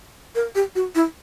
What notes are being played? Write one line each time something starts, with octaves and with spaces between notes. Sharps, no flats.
A#4
G4
F#4
E4